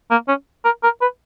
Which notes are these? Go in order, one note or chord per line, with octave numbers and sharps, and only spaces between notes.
A#3
C#4
A#4
A#4
B4